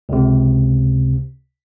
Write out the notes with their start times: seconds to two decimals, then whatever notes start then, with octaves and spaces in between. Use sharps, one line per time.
0.09 C#2 C3